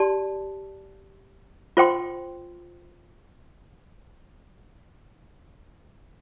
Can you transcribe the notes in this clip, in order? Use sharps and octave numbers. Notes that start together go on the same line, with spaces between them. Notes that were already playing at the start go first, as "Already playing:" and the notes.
Already playing: G4 D5 A5 C6
F4 C5 G5 C6